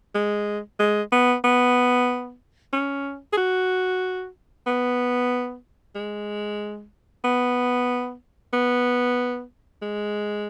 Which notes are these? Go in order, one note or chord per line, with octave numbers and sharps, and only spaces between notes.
G#3
G#3
B3
B3
C#4
G#4
F#4
B3
G#3
B3
B3
G#3